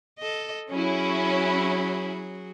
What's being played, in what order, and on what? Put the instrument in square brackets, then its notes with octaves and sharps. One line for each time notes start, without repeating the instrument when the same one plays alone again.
[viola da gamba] A4 D#5
[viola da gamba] F#3 F#4 G#4 [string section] C#4 E4